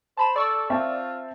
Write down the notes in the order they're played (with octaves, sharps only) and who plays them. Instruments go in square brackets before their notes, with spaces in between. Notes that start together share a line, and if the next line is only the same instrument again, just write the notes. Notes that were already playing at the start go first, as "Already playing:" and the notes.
[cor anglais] C5 [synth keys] A5 B5 E7
[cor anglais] A4 [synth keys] D5 C#6 E6
[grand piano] C4 E5 A5 [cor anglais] F4